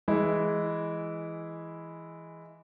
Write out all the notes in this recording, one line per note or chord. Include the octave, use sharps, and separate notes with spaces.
E3 G#3 E4